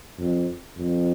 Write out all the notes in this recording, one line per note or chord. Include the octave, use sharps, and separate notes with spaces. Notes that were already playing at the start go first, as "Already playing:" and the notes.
F2
F2